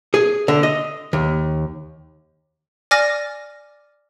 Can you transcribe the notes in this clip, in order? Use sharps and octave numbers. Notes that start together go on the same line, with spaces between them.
G#4
D3
D#5
D#2
D5 G#5 D6 F6 A#6